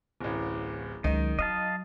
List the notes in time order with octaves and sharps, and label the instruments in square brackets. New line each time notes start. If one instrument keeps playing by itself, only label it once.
[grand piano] D1 A1
[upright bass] C#2 F#3 [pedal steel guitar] D#3 [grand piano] D#4
[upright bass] F#3 [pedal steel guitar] D#5 F5 A5